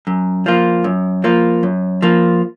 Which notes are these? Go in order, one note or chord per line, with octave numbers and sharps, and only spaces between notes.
F#2
F3 A#3 F4
F#2
F3 A#3 F4
F#2
F3 A#3 F4